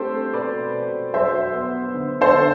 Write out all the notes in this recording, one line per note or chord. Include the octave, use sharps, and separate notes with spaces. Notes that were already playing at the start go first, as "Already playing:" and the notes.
Already playing: A3 C4 G4 A4 C5
B2 B4 D5
B2
F#3 C5 E5
B3
D3
A4 C5
D3